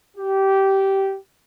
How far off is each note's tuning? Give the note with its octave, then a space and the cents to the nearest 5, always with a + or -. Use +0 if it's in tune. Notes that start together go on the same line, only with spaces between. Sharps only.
G4 -15